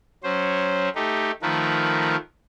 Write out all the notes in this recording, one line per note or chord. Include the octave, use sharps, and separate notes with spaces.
F#3 C#4 C5
A3 D#4 G4
D#3 F3 A3 A#4 B4